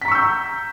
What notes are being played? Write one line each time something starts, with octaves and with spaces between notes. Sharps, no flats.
A#5 C#6 E6 G6 B6